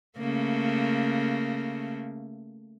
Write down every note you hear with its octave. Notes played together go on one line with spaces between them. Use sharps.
C#3 A3 A#3